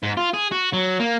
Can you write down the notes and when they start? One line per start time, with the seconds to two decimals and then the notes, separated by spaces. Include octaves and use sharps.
0.03 G#2
0.17 F4
0.33 G#4
0.51 F#4
0.73 F#3
1.00 A#3